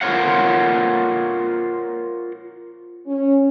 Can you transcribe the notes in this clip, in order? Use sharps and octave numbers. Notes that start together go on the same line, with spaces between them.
F4 A#4 C5 C#5 F5 F#5
C#4